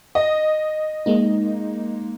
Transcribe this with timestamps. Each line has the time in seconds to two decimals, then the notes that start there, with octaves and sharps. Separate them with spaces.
0.15 D#5
1.06 G#3 A#3 D#4